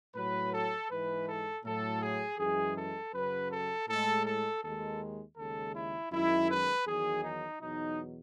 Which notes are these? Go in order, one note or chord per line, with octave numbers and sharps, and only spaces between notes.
A2 F#3 B4
A4
G#2 E3 G#3 B4
A4
A2 F#3 A4
G#4
F#2 E3 G#3 G#4
A4
F#2 C#3 F#3 B4
A4
A2 G#3 A4
A4
D#2 D#3 G#3 A4
D#2 C#3 G#3 A4
E4
F#2 D#3 G#3 E4
B4
E2 D#3 F#3 G#4
D#4
E2 B2 F#3 D#4